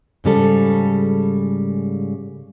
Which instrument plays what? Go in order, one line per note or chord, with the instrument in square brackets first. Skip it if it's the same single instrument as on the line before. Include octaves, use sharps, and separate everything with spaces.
[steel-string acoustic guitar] G#2 C#3 G3 A4